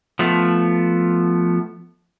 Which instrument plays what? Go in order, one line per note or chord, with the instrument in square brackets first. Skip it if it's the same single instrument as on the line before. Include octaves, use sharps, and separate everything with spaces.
[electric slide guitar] F3 A3 B3